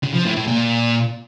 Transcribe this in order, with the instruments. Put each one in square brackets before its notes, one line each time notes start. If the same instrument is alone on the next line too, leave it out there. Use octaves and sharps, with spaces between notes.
[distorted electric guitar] C#3
F3
A2
A2
A#2